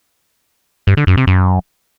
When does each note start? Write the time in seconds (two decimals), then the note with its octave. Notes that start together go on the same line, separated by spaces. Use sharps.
0.87 G2
0.97 D3
1.07 F#2
1.17 C3
1.27 F#2